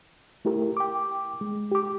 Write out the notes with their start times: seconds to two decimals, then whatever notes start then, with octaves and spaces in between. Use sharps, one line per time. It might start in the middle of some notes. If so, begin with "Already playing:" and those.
0.45 A3 E4 G4 A#4
0.77 G5 D6
1.41 G#3
1.71 G4 D6